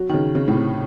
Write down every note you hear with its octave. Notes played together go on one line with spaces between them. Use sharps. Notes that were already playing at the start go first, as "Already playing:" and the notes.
Already playing: F#3
D#3
C#3
C#3
A2
C3